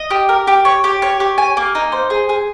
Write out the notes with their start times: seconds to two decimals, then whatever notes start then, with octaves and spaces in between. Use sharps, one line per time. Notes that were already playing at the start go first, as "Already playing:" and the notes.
Already playing: D#5
0.11 G4
0.29 A#4
0.47 G4
0.65 C#5
0.84 G4
1.02 C#5
1.20 G4
1.38 G#5
1.57 A#3
1.75 D#4
1.92 C5
2.10 G#4
2.29 G#4